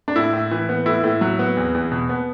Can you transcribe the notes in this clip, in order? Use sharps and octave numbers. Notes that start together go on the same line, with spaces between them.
D4
A2 E4
A2
E3
B3
A2 E4
A2
F#3
B3
E2
E2
B2
B3